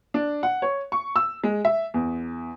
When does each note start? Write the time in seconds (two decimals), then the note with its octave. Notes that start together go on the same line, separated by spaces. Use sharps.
0.14 D4
0.43 F#5
0.62 C#5
0.92 C#6
1.16 E6
1.44 G#3
1.65 E5
1.94 E2